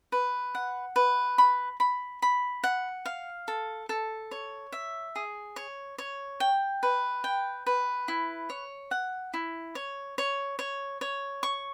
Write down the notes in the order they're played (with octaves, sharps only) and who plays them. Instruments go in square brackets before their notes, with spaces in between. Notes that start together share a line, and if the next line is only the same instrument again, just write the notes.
[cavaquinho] B4
F#5
B4
B5
B5
B5
F#5
F5
A4
A4
C#5
E5
G#4
C#5
C#5
G5
B4
G5
B4
E4
C#5
F#5
E4
C#5
C#5
C#5
C#5
C#6